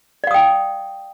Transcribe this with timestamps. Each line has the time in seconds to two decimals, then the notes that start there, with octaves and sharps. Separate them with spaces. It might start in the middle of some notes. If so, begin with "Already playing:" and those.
0.24 D5
0.27 F5
0.31 D#6
0.34 G5